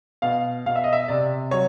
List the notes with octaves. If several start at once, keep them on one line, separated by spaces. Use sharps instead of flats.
B2 F5
B2 F5
E5
D#5
E5
C3 D5
F#3 C#5